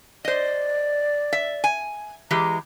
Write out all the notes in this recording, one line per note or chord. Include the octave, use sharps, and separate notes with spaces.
C5 D5 D#5
E5
G#5
E3 G#3 G4 A#5